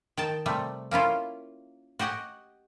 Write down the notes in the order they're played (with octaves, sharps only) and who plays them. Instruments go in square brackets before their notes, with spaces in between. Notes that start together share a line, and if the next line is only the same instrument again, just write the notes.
[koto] D#3 G5 A5
C3 G3 A3
A#3 C#4 E4 F4
F#4 G4 D#5 F#5 G#5